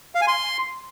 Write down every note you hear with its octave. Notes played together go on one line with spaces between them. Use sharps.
F5
G#5
C6